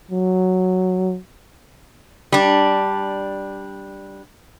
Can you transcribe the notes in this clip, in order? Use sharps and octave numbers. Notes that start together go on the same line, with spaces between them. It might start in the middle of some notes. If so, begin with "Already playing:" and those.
F#3
G3 D4